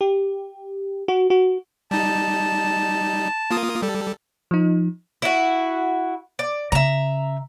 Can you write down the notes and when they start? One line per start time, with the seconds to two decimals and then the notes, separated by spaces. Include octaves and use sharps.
0.01 G4
1.08 F#4
1.30 F#4
1.91 G3 D#4 A5
3.51 A#3 F4 D#6
3.82 G3 A4
4.51 F3 D#4
5.22 E4 F#4
6.39 D5
6.72 C#3 E5 A#5